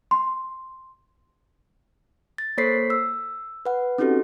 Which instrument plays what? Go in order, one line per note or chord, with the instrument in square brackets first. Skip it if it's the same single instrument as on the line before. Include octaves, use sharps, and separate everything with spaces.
[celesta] C6
[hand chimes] A6
A#3 A4 C5 C#5 B6 C7
E6
B4 F#5
C4 C#4 D#4 F#4 G4 A4